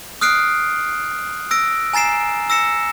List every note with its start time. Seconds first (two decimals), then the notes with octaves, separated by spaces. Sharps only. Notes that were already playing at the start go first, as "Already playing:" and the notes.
0.21 D#6 F6 F#6 C7 D7
1.51 E6 A#6 D7
1.93 G#5 A#5 A6 C7 E7
2.50 E6 A#6 C#7 E7